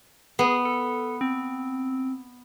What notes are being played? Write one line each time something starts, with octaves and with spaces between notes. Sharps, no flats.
B3 G#4
A4
C4